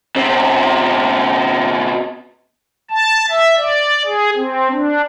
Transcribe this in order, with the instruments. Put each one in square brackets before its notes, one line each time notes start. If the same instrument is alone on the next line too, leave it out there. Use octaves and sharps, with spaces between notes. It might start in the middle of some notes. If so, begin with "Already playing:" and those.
[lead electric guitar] B2 C4
[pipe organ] A5
E5
D5
G#4
C4
D4